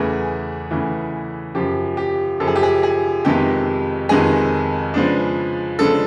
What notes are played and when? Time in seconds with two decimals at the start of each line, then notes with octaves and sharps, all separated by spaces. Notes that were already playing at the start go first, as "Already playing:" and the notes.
Already playing: E2 C#3 E3 A3 G#4
0.71 E2 C#3 E3 A3
1.55 F#2 C#3 F3 G4
1.97 G4
2.40 F#2 C#3 F3 A4
2.47 G#4
2.56 G4
2.63 G#4
2.83 G#4
3.25 F2 C3 D#3 G#3 B3 G4
4.09 F2 C3 D#3 G#3 B3 G#4
4.94 C#3 F3 G#3 B3 D4
5.79 C#3 F3 G#3 B3 D4 A4